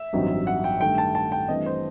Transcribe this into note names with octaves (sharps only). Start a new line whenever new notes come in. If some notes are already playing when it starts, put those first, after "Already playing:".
Already playing: E5
A1 G2 F#3 C4 D#4
F#5
G5
G2 D#3 A3 G5
A5
A5
G5
G2 E3 A3 C4 D#5
C5